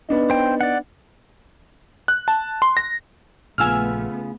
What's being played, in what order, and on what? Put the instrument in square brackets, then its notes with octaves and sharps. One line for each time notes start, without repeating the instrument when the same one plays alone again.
[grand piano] B3 D4 D#4
[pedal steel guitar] C5 G5
D5 F#5
[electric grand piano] F#6
A5
C6
A#6
[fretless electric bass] A#1 [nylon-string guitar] C#3 F4 [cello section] A3 B3 [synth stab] G#5 E6 F6